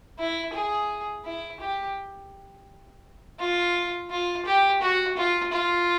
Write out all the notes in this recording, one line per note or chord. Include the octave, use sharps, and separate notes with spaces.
E4
G#4
E4
G4
F4
F4
G4
F#4
F4
F4